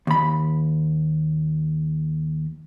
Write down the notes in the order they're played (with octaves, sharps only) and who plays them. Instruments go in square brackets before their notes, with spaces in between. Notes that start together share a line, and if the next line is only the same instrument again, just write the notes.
[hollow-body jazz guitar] D#2 B5